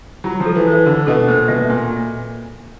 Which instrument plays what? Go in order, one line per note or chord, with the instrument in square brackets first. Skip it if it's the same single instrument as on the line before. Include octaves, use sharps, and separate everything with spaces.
[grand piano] F#3 [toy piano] F4
[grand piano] F3
[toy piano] A4
[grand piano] E3
[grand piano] E3 [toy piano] C5
[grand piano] D3 [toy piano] F#4
[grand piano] B2 [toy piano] A4
[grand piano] A#2 [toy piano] C5
[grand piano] B2 [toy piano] E5
[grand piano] A#2 [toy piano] G#5